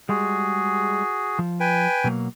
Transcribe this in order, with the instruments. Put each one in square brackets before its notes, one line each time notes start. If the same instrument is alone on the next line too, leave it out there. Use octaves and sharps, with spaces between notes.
[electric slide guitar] G3 G#3 [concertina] F#4 G#4
[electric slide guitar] F3
[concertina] B4 G5 G#5
[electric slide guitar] B2 F#3 A#3